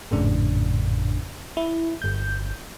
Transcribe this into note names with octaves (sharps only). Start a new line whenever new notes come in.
G#1 F2 A2 C#3 D4
E4
G1 G6